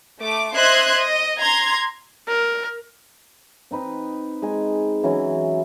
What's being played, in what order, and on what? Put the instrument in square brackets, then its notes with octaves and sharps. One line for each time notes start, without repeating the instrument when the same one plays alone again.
[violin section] A3 D6
C5 D#5 E5 C6 F#6 G#6
D#5
A#5 C6 G#6
[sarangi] A#4
[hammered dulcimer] C4 D#4 B4 D#5
G#3 D#4 G#5
E3 F#3 C#4 E4